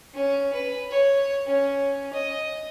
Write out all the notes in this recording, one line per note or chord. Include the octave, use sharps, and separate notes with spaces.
C#4
B4
C#5
C#4
D#5